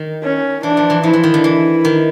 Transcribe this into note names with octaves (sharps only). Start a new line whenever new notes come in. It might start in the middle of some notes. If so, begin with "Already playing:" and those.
Already playing: D#3
C#4
E3 D4
F3
E3
F3 E4
E3
D#3
D3
E3
D#3